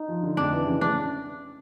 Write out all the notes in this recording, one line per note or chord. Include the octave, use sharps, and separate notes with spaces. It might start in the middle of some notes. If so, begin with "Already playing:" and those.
Already playing: D#4
F3
D3
F2 D4
E3
C#3
D4